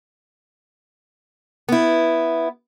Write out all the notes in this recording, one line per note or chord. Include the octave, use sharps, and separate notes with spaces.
B3 E4